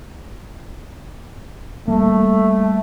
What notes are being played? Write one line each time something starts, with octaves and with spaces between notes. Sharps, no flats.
G3 A3 A#3